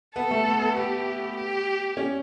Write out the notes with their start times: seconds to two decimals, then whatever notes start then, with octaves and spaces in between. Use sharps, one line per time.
0.16 B3 A4
0.31 A3
0.46 B3
0.61 B3
0.76 B3 G4
1.37 G4
1.97 C#4